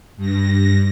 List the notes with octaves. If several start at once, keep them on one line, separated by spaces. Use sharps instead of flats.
G2 A#6